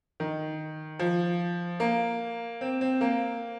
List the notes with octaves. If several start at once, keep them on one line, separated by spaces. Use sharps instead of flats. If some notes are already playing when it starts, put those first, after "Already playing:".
D#3
F3
A#3
C4
C4
A#3